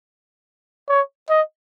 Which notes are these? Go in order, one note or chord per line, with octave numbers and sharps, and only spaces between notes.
C#5
D#5